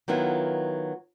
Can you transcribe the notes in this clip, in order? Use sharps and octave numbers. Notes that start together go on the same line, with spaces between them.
D#3 F#3 B3 E4 F4